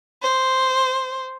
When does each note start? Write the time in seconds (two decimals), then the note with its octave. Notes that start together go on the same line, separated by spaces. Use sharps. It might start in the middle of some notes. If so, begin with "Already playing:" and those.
0.23 C5